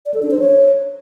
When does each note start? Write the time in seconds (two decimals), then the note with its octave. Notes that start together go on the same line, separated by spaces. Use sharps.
0.06 D5
0.14 A4
0.23 D4
0.31 C5
0.39 C#5